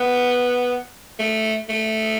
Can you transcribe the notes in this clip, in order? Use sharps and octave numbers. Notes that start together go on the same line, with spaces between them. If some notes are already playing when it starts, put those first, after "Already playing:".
Already playing: B3
A3
A3